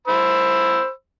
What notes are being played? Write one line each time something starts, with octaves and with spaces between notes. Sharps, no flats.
C5 B5 E6